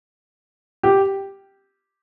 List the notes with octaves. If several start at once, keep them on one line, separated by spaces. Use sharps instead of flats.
G4